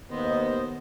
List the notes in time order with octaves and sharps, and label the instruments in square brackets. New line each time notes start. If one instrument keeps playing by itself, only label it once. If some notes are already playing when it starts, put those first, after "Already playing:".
[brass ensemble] D#2 [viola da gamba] B3 [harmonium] C5 D#5